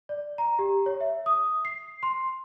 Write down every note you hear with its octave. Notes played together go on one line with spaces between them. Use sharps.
D5
A#5
G4
C#5
E5
D#6
C7
C6